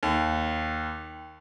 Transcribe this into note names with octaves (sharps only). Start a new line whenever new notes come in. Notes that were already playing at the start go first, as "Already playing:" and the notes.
D#2